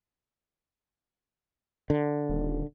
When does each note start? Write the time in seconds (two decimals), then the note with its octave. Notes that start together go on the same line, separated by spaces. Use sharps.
1.90 D3
2.29 D#1